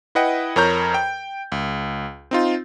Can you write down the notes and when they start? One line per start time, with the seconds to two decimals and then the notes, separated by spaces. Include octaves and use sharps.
0.15 E4 B4 D#5 F#5 G5
0.56 F2 A#4 C#5 A#5 G6
0.94 G5
1.52 C#2
2.31 C4 D#4 F4